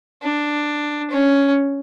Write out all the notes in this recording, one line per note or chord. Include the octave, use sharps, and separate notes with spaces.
D4
C#4